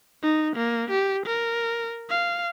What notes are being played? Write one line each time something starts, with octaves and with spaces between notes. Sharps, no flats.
D#4
A#3
G4
A#4
F5